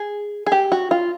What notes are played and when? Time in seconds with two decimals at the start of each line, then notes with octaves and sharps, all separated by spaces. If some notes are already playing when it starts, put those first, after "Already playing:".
Already playing: G#4
0.46 G#4
0.52 G4
0.72 F#4
0.91 F4